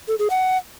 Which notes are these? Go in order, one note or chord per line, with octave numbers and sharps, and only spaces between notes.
A4
G#4
F#5